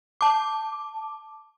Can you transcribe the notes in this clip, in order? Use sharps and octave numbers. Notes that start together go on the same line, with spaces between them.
A5 D6